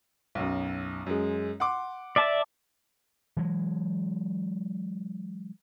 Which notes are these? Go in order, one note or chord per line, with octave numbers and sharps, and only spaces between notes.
B1 F#2
F#2 G#3
F#5 C6 D6
D5 E5 A5
E3 F#3 G#3